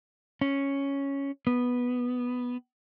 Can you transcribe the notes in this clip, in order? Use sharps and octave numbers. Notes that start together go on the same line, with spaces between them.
C#4
B3